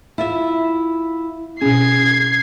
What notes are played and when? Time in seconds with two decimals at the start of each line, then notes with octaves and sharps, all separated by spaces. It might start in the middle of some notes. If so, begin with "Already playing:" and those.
0.18 E4 F4 E5
1.61 B2 C#4 G#4 G#6 C7